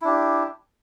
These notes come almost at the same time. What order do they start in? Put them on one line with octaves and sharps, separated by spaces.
E4 D4 G4